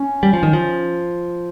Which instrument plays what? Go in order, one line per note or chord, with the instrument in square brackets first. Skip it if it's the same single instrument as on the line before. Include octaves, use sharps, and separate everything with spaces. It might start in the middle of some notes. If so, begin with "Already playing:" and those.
Already playing: [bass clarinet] C#4
[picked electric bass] G3
F3
D#3
F3